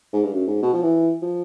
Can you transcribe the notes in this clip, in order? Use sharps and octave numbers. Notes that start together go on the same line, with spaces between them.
G#2
G2
F#2
G#2
B2
F3
E3
F3